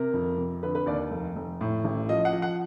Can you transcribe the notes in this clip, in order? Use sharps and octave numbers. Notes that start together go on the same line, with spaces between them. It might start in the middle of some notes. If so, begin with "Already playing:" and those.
Already playing: C3 A#4
F2
C3
D3 B4
B4
D#2 D5
F1
F1
A2
A1
F3 D#5
F#5
F3
F#5